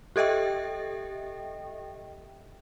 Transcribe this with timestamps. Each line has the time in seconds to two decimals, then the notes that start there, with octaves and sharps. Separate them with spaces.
0.16 G4 A4 D#5 E5 G5